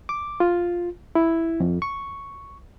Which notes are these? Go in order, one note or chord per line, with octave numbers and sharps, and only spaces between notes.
D6
F4
E4
F2
C#6